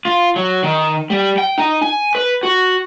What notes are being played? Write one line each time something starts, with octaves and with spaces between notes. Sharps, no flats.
F4
F#3
D#3
G3
G5
D#4
G#5
B4
F#4